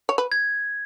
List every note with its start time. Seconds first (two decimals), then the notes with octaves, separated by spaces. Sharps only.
0.09 C#5
0.18 B4
0.32 G#6